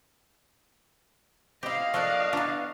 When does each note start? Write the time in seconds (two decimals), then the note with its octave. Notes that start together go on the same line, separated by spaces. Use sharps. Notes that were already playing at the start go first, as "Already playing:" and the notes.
1.63 C4 E4 G4 D#5 F5
1.94 F3 A#3 D4 A4 C#6 F6 F#6
2.33 E3 B3 D4 A#5 C#6